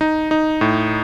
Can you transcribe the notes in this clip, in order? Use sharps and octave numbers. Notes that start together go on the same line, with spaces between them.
D#4
D#4
A2